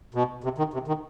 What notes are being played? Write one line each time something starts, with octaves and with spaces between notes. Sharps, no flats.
B2
C3
D#3
C3
D#3